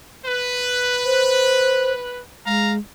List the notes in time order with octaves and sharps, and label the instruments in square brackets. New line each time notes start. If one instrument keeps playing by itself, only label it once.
[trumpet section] B4
[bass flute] C5
[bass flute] G#3 [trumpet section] F5 A#5